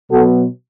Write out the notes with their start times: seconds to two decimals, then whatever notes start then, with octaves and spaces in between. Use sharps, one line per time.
0.10 B2 F#3 B3 F#4 A4